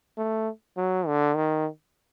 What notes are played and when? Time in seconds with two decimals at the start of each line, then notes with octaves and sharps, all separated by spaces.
0.18 A3
0.77 F#3
1.07 D3
1.36 D#3